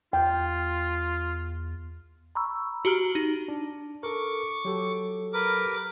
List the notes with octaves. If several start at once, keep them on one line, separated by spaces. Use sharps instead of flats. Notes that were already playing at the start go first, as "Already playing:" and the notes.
E2 F4 G5
A#5 B5 C#6 E6
F#4 G4 A#5 F6
D#4
D4
A4 A#4 C#6 D6
F#3 G4 A4
A#4 B4 D6